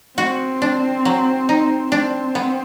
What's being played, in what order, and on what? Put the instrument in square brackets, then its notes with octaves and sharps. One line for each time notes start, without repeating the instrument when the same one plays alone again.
[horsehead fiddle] C4 [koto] F#4
[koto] D4
F#3
D#4
[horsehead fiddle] C4 [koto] D4
[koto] B3